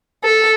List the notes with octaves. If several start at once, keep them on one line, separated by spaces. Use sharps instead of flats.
A4